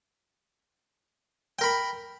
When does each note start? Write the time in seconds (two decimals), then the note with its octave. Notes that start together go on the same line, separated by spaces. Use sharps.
1.59 G5
1.61 A#4
1.64 B5